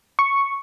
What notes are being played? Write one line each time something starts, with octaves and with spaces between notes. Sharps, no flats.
C#6